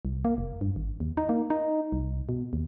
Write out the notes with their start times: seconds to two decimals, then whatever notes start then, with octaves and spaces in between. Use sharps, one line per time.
0.05 C2
0.25 A#3
0.38 F1
0.61 G2
0.76 G#1
1.00 D#2
1.17 D#4
1.29 A#3
1.50 D#4
1.92 C2
2.29 B2
2.53 D#2